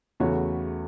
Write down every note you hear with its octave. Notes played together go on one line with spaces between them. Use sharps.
E2 C#3 A3 F#4 C#5